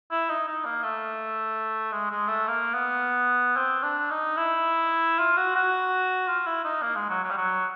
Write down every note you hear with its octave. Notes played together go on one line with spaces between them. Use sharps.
E4
D#4
D#4
A#3
A3
G#3
G#3
A3
A#3
B3
C4
D4
D#4
E4
F4
F#4
F#4
F4
E4
D#4
A#3
G#3
F#3
F#3
G3
F#3